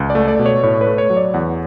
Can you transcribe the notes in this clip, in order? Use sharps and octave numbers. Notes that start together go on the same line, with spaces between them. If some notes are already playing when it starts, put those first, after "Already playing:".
Already playing: C#2
D5
A3
D5
B2
C#5
A2 C#5
B4
A3
C#5
F#3
D5
E2 F#5